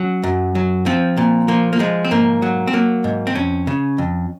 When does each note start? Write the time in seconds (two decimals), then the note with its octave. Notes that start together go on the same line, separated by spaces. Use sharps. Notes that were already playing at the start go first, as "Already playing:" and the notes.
Already playing: F#3 C#4
0.23 F#2
0.55 F#3
0.86 F3 C4
1.17 A#2
1.48 F3 A#3
1.73 A#3
1.79 F3 G#3
2.05 C4
2.11 G#2 A#3
2.42 F#3
2.67 C4
2.73 F#3 A#3
3.04 G#2
3.27 C4
3.35 F2 C#4
3.67 C#3
3.98 F2